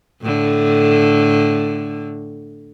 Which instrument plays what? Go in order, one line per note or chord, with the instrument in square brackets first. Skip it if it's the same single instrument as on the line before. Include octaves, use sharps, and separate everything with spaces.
[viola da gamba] A2 D3